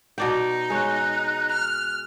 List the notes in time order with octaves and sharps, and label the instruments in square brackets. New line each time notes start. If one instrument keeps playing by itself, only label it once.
[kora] B2 D5 G5 [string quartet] D#4
[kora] G#3 C#5 [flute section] F#6
[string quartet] F6